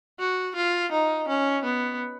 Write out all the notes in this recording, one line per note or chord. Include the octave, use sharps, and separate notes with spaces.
F#4
F4
D#4
C#4
B3